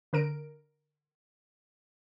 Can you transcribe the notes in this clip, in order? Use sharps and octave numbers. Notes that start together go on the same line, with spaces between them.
D3 A#4 D7